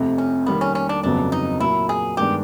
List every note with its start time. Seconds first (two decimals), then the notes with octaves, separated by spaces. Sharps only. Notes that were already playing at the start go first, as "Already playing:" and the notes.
Already playing: F1 F2 C3
0.18 C#4
0.47 D#3 G3 A#3 B3
0.61 C#4
0.75 C#4
0.89 D4
1.03 G1 F2 C#3 F#3 B3 D4
1.32 D#4
1.60 A#2 F#3 A#3 E4
1.89 G#4
2.17 G2 D#3 G#3 B3 D4 G4